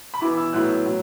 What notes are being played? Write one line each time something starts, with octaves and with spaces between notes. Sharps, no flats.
B5
E3 B3 E4 D6
E6
A2 F#3 B3 E4 F#6
A2 F#3